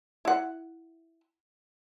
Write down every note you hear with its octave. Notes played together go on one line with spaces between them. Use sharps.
E4 F#5